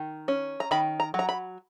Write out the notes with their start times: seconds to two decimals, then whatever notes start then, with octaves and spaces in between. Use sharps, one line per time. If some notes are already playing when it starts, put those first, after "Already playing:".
Already playing: D#3
0.28 C#4
0.60 A#5
0.71 D#3 B5
1.00 A#5
1.14 F#3 A#5
1.29 B5